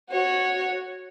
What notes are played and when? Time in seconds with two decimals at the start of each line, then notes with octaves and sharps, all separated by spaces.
0.10 F#4 C#5